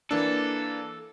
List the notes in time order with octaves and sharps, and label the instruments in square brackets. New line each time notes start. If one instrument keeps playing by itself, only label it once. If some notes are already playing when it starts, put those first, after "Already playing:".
[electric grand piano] E3 A#3 D4 [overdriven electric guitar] A4